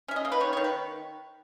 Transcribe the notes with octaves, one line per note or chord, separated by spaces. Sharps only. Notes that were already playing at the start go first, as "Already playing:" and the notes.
C#4 E5
D#5
A#3
B4
D#3 C#5
D#3 C#5
B4